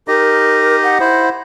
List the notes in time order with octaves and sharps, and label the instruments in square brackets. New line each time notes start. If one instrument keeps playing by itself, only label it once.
[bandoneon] D#4 G4 D#5 [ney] A#4
[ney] F#5
[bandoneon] E4 C5